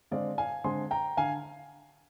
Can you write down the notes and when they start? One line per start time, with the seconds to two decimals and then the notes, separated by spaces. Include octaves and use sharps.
0.11 D3 G#3 C4 D5 F5
0.38 F5 G#5
0.64 D3 G#3 C4 G#5 C6
0.91 G5 A#5
1.17 D3 F5 G#5